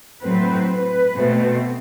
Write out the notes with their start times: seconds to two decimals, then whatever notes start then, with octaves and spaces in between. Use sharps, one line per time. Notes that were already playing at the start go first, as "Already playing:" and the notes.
0.23 A2 F#3 A3 C4 B4
0.68 B4
1.15 B2 A3 C4